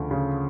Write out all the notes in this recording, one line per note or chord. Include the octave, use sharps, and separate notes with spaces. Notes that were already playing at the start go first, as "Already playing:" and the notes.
Already playing: D2 C#3 F3
C#3